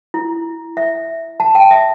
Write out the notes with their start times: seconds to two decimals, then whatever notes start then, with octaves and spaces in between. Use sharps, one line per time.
0.14 E4
0.77 E5
1.40 A5
1.55 G5
1.71 E5